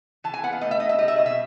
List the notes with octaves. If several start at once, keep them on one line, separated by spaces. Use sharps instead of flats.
E3 A5
G#5
B3 F#5
F5
A3 D#5
E5
D#4 D#5
E5
G3 D#5
E5
B2 D#5
E5